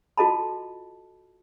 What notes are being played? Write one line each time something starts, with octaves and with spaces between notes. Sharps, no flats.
F4 F#4 A4 D#5 A5 B5